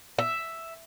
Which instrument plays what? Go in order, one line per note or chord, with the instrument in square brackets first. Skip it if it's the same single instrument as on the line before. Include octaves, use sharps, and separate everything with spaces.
[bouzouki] E5